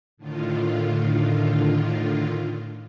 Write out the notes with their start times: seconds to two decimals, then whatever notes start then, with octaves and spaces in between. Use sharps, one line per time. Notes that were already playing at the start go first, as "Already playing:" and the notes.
0.17 A2 D3 D#3 F4